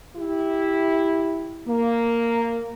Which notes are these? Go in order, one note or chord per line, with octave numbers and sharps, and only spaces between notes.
E4 G4
A#3